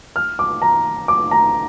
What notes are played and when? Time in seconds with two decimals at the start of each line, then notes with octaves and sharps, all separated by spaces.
0.16 F6
0.39 D6
0.62 A#5
1.08 D6
1.31 A#5